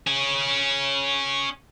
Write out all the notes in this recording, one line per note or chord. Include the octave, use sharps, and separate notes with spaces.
C#4 G#4